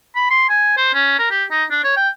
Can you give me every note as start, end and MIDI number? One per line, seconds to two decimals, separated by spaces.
0.16 0.29 83
0.30 0.44 84
0.49 0.74 80
0.77 0.92 72
0.94 1.14 61
1.18 1.26 70
1.31 1.44 67
1.51 1.64 63
1.71 1.81 62
1.84 1.95 73
1.96 2.09 79